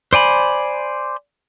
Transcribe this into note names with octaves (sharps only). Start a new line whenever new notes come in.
C5 D5 G#5 B5